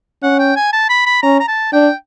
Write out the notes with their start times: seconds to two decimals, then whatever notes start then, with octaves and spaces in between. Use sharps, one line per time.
0.23 C#4 F#5
0.39 G5
0.56 G#5
0.73 A5
0.89 B5
1.06 B5
1.23 C#4 A#5
1.40 A#5
1.48 A5
1.73 D4 G5